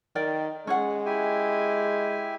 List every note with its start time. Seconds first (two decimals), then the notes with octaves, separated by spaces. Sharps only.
0.15 D#3 A#4 D5 G5
0.67 G#3 C#4 G#4 F#5
1.06 E4 G4 G#5